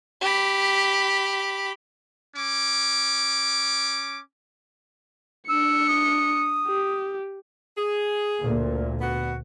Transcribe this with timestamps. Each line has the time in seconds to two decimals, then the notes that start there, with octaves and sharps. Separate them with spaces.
0.21 G4 B5
2.35 C#4 D6
5.49 D4 E6 C#7
5.89 D#6
6.68 G4
7.77 G#4
8.40 D2 A#2
9.01 B3 F#4